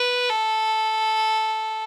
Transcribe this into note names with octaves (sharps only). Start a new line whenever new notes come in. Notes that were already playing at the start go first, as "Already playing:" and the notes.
Already playing: B4
A4